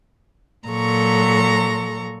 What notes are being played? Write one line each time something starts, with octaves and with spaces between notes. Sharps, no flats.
A#2 F#3 A4 A#5 C#6